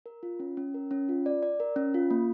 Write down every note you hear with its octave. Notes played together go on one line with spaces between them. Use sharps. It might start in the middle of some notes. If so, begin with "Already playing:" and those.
A#4
F4
C#4
C#4
A#4
C#4
F4
D5
D5
A#4
C#4
F4
A#3